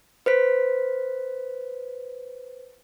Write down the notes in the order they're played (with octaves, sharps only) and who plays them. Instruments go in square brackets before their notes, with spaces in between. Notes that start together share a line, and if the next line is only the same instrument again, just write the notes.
[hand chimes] B4 C5 B6